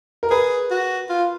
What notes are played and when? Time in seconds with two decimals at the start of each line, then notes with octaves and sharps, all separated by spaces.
0.23 A#4
0.30 G#4 B4
0.70 F#4
1.09 F4